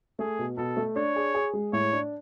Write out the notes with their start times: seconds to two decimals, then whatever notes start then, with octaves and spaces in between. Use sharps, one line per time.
0.19 A3 G#4
0.39 B2
0.58 B2 A4
0.77 A3
0.96 D4 C#5
1.16 G#4
1.34 G#4
1.53 G#3
1.73 A2 C#5
1.93 D4